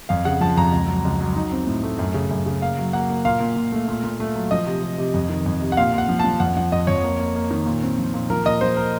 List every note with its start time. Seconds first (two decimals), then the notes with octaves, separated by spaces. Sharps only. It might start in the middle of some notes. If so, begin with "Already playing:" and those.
0.09 F2 F5
0.25 C#3 F#5
0.41 F3 A5
0.57 F2 A#5
0.72 C#2
0.88 F#3
1.05 C#2
1.20 F#3
1.36 D#4
1.52 C4
1.67 A2
1.83 A3
1.99 F#2
2.14 C#3
2.31 F#2
2.46 C#3
2.62 A#3 F5
2.78 F#3
2.93 A#3 F#5
3.10 A#3
3.25 A#2 F5
3.40 A#2
3.56 A#2
3.72 A3
3.88 A#2
4.04 A#2
4.20 A3
4.36 F#3
4.51 F3 D#5
4.67 C3
4.82 C3
4.98 C3
5.14 F2
5.29 D#3
5.46 F2
5.61 C3
5.72 F#5
5.77 A#2 F5
5.93 A#2
5.98 F#5
6.09 F3
6.19 F3 A5
6.40 F2 F#5
6.57 F3 F#5
6.72 F2 D#5
6.87 F2 C#5
7.03 A#3
7.19 A#3
7.36 A#3
7.51 D#3
7.66 A#2
7.83 C4
7.98 F3
8.14 A#2
8.30 F3 A#4
8.46 A#2 D#5
8.61 F3 C5
8.77 A#4